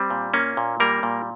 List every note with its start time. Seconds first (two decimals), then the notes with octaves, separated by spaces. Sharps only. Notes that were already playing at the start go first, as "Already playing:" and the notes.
Already playing: G3 C4
0.10 A#2
0.34 A#3 C#4
0.57 A#2
0.80 G3 A#3 A#4
1.03 A#2